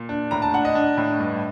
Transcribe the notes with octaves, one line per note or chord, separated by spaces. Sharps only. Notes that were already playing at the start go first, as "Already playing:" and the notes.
Already playing: A#2
D4
A2 A#5
A5
D4 F#5
D#5
D4
A2
G2